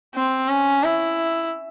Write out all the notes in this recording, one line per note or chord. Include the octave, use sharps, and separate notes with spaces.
C4
C#4
E4